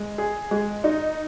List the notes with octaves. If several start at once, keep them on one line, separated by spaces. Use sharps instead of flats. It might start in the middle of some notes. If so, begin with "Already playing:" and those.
Already playing: G#3
G#4
G#3
D#4